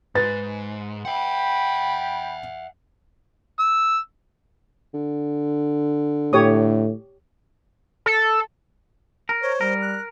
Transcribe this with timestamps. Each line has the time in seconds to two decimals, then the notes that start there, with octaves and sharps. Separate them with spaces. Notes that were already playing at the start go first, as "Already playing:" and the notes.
0.15 G#2 B4 A6
1.05 E5 F#5 G5 B5
3.59 E6
4.94 D3
6.33 A2 G4 C#5 D#6
8.06 A4
9.29 A#4
9.42 C5 C#5
9.61 G3 A#4
9.82 F#6